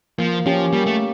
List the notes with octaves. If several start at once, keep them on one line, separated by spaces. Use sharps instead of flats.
F3 A#3
F3 C#4 G4
G3 A#3
A3